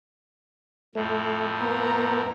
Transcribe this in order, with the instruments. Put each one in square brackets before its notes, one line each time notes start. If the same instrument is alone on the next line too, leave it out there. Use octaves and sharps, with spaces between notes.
[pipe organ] F2 A2 [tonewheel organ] A3
[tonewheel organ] A#3 B3 [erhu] A#5